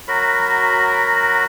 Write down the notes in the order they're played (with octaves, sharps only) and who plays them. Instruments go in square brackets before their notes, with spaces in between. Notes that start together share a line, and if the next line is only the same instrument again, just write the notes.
[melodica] F#3 F#4 A#4 B5